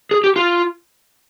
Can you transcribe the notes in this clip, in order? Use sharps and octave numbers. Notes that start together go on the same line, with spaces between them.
G#4
G4
F4